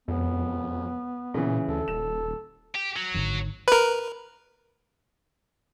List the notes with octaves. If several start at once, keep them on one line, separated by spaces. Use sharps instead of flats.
E1 F2 B3
A#2 C#3 E3
D2 A4
D#1 E7
G4
F#3
G#1 D3
A#4 B4